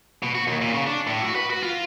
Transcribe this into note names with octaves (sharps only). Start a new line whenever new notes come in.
B2
F#4
D#2
A#2
C#3
D4
A2
F#4
B4
F#4
F4